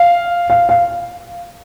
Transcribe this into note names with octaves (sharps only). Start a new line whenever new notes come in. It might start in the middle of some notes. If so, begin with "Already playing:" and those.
Already playing: F5
F5
F5